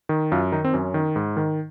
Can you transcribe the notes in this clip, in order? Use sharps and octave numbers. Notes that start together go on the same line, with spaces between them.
D#3
F#2 F4
D#3 D#4
C4
F#2 C#4
D#3
G#2
D#3